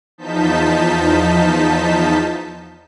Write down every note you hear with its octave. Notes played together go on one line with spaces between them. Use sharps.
E2 F3 D#4 A5 G6 B6